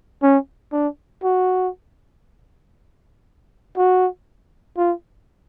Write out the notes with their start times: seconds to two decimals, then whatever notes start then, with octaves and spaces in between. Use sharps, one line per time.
0.23 C#4
0.72 D4
1.23 F#4
3.77 F#4
4.77 F4